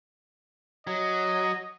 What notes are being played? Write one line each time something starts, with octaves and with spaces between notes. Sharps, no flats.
F#3 D#5